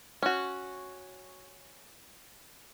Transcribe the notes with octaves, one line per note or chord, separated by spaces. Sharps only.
C#4 F#4